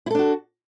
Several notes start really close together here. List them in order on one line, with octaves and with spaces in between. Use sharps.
E4 A4 D4 F#4